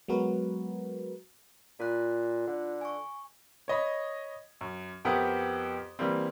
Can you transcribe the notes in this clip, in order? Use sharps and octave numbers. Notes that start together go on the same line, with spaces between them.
F#3 G#3 B3 F#4 A#4 B4
A#2 F4 F#6
D3
G#5 C#6
C#5 D#5 B5
F#2
F2 B3 G4 A#4 F#5 D#6
E3 G3 A#3 C4